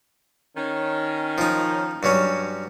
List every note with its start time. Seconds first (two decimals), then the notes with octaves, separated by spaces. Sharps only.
0.56 D#3 C#4
1.38 F3 D#4
2.03 G2 F#3 C#4